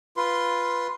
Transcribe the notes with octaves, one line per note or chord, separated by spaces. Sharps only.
F4 B4 C6